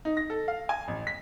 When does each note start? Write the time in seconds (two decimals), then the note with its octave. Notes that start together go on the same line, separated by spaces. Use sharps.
0.05 D#4
0.17 A#6
0.30 A4
0.48 F5
0.69 G#5
0.88 A1
1.07 B6